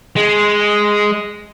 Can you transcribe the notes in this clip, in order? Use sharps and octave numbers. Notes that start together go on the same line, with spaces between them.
G#3